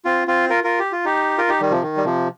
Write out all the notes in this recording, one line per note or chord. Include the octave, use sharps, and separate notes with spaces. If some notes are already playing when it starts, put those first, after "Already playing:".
C4 F4
C4 F4
F4 A#4
F4 A#4
G4
F4
D#4 G4
F4 A#4
D#4 G4
D#3 G3
C3 F3
D#3
G3
C3 F3